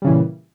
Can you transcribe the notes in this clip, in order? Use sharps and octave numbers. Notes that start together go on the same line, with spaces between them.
A#2 C#3 E3 G3